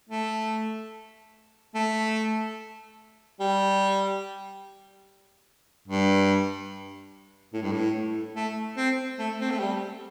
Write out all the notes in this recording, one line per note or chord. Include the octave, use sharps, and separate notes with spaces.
A3
A3
G3
G2
A2
G2
A2
A3
C4
A3
C4
A3
G3